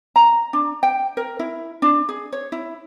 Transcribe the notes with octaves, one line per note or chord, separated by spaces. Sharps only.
A#5
D4
G5
A#4
E4
D4
G#4
C#5
E4